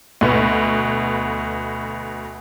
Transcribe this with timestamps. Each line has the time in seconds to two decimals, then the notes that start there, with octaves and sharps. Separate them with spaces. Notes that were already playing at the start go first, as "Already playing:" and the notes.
0.21 D2 B2 B3